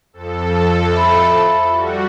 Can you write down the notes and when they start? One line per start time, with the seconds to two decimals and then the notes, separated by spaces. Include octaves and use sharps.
0.13 F2 A4
0.92 E5 B5
1.69 G3 F#4